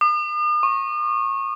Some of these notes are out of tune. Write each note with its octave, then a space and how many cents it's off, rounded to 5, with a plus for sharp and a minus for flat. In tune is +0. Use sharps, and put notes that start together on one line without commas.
D#6 -45
C#6 -20